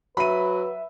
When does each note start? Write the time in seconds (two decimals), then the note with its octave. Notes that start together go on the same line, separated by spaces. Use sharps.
0.17 F#3 B4 E5 B5 D#7